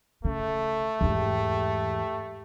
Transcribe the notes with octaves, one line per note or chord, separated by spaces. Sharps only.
C#3 A3 A4
E2 G#2 G4